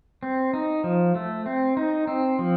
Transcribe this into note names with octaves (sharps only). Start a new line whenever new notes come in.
C4
D#4
F3
A3
C4
D#4
C4
F3